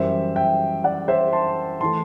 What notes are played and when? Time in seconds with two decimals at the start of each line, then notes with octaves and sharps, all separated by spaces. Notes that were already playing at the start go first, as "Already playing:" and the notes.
Already playing: F#2 E3 G3 C5 E5
0.36 E5 G5
0.84 D5 F#5
1.08 C5 E5
1.33 A5 C6
1.81 E3 A3 A5 C6